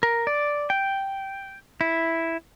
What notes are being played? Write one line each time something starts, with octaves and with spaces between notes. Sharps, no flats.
A#4
D5
G5
E4